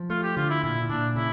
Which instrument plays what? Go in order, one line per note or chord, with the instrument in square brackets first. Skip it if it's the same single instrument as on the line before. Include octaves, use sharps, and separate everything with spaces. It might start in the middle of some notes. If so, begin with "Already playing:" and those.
Already playing: [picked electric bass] F3
[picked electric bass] A3 [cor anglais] F4
[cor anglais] G4
[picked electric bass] D3 [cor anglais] F4
[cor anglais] E4
[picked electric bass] A#2 [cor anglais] E4
[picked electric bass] A#2 [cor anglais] D4
[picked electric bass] C#3 [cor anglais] E4